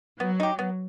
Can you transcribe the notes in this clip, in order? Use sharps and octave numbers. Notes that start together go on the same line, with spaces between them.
F#3 B3
D#4 G4
B3